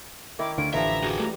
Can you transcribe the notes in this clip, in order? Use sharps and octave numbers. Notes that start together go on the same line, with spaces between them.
D#3 C#4 E4 D6
D2 D3 C#4 F4 D7
A1 D3 E3 F3 G4 E5 A#5
F#4 G#4
G3 A3 A#5